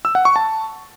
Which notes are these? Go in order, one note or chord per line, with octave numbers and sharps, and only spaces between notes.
E6
F#5
C#6
A5